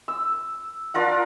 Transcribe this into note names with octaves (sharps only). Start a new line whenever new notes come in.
E6
D4 F4 A#4 F#5